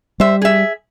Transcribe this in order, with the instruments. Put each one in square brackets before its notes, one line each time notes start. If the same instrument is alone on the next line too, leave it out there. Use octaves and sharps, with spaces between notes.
[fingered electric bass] G3 [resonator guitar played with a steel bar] C5 E5
[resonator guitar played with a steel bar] G#4 E5